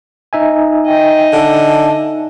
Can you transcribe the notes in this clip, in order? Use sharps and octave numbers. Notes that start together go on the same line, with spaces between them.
D#4 E5 G#5
D#5 G5
D3 A5